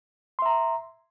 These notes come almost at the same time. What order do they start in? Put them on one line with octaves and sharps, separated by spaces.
C6 E5 A#5